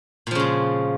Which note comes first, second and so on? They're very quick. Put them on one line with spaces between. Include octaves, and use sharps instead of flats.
A#2 F3 C#3 G#3